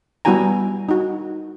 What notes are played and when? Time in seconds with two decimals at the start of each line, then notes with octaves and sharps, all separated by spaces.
0.25 G3 B3 E4 F#4 G#5 A#5
0.89 D#4 F#4